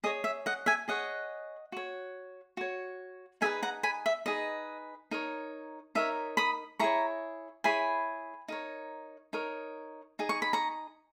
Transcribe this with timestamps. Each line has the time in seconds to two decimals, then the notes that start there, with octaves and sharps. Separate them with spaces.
0.04 G#4 C#5 D#5
0.24 E5
0.46 D#5 F#5
0.66 E5 G#5
0.88 G#4 C#5 D#5 F#5
1.72 F#4 C#5
2.57 F#4 C#5
3.41 D#4 G#4 B4 E5 G#5
3.63 F#5 A#5
3.83 G#5 B5
4.06 E5
4.26 D#4 G#4 B4 D#5
5.11 D#4 A#4 C#5
5.95 D#4 A#4 C#5 E5
6.37 B5 D#6
6.79 E4 G#4 C#5 A#5 C#6
7.64 E4 G#4 C#5 G#5 B5
8.48 D#4 A#4 C#5
9.33 D#4 A#4 C#5
10.19 D#4 G#4
10.29 C#6
10.42 B5
10.53 A#5 C#6